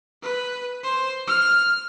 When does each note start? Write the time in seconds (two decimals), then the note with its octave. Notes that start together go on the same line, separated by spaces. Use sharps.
0.23 B4
0.83 C5
1.27 F6